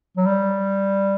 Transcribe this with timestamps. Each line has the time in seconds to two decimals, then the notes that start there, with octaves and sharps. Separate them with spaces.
0.17 F#3
0.26 G3